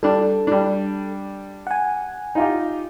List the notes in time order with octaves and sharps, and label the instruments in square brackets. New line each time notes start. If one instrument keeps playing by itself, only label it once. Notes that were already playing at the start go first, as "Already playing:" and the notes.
[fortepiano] G3 D4 [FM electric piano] A4
[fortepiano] G3 D4
[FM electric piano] F#5 G#5
[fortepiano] D#4 F4 G4